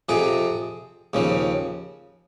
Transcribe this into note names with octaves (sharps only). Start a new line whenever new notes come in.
F2 C3 F3 G#4
D#2 C#3 F3